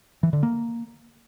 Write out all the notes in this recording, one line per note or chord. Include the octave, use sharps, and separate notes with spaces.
E3
D3
A#3